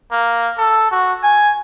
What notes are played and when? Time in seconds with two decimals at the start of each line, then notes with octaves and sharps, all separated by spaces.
0.11 A#3
0.57 A4
0.92 F#4
1.23 G#5